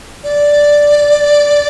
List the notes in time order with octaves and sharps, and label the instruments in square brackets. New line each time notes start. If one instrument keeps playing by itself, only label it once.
[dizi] D5